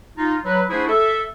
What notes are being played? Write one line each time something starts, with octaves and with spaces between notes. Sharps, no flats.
D#4 F4
F#3 B4
A3 D4 E4 F#4 G#4 C5
A4 E5